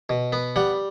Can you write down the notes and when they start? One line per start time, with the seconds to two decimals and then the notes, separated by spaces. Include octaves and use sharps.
0.09 B2
0.33 B3
0.56 G3 F#5